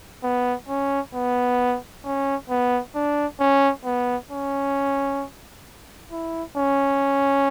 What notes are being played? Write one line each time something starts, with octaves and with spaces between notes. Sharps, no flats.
B3
C#4
B3
C#4
B3
D4
C#4
B3
C#4
E4
C#4